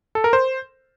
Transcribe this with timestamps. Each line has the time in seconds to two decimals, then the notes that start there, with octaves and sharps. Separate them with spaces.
0.15 A4
0.24 A#4
0.33 C5